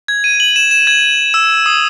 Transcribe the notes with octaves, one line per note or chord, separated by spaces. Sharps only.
G#6
D#7
F#7
E7
E7
G#6
E6
D#6